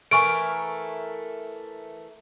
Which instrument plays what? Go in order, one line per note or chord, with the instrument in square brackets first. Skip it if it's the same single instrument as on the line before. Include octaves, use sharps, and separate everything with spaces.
[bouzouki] E3 A3 A#4 [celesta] G#5 C#6 D7